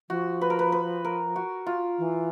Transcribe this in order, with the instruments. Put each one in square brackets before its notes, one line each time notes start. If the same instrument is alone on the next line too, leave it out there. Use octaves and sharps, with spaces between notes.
[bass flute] F3 [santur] F#4
[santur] B4
A#4
B4
B4
A#4
F#4
F4
[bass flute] E3